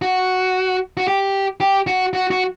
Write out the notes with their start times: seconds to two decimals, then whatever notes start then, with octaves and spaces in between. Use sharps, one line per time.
0.02 F#4
0.97 F#4
1.08 G4
1.60 G4
1.87 F#4
2.13 F#4
2.30 F#4